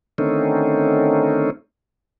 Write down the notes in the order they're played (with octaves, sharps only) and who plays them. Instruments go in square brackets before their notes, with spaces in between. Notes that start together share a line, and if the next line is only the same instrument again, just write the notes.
[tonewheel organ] D3 D#3 A3 C4 C#4 D#4